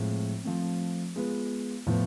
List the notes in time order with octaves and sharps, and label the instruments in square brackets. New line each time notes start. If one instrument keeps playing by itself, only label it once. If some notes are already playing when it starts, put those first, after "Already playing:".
Already playing: [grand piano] A2 F3 G#3 C4
F3 A3 C4
G#3 B3 F4 B4
A2 F3 B3